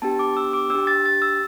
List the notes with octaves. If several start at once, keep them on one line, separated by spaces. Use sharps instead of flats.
B3 D4 G4 A5
D6
E6
D6
D4 G4 E6
A6
A6
E6